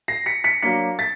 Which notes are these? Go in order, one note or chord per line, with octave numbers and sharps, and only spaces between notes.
A#6 C7
B6 C#7
B6 C#7
F#3 A#3 D4 B6 C#7
A6 B6